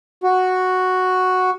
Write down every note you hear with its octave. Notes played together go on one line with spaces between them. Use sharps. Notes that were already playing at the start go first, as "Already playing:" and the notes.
F#4